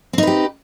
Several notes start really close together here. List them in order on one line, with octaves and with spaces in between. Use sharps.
C4 D#4 B4 G4